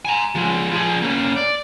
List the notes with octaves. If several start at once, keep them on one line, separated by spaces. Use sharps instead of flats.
G#5 A#5
F3 G#3
F3 G#4
A#3 C#4
D5